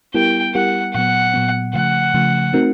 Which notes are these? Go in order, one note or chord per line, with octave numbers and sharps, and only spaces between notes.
G3 B3 E4 G4 A#4 G5
G3 B3 E4 G4 A#4 F#5
A#2 F#3 B3 F#5
A#2 F#3 B3
C#3 F3 A3 F#5
C#3 F3 A3
A3 C4 D#4 F#4 A#4